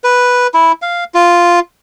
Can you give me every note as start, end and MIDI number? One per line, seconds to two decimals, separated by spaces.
0.04 0.47 71
0.54 0.72 64
0.82 1.04 77
1.14 1.60 65